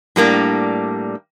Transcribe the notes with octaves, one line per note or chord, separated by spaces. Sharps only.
A2 G3 A#3 D4